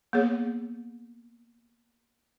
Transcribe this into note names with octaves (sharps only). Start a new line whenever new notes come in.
A#3 B3 G#4 C#5